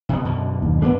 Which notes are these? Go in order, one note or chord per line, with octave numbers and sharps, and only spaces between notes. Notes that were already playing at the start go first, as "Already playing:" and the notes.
C3 A#3 B3
F#2 B2 D3
D#2
G2 A3 B3 D4